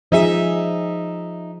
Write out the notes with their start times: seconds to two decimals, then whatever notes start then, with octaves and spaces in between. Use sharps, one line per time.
0.12 F3 D#4 G#4 E5